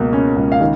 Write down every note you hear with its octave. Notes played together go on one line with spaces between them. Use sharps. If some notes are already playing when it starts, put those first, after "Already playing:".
Already playing: C#2 B2 A#3 A#4
C#4
C#2
F5
D#3